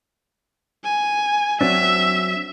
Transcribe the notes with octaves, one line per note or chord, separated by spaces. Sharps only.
G#5
F#3 C4 D4 E5